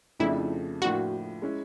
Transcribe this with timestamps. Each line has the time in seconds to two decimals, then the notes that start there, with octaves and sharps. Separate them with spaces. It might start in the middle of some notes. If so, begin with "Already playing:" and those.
0.19 F2 C#3 F3 A3 D4 E4
0.82 A2 F3 A#3 D4 F4 F#4
1.42 G#3 C#4 E4